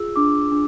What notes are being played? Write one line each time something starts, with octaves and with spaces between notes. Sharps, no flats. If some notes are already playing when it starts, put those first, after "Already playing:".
Already playing: F4 G#4 E6
D4 D6
D4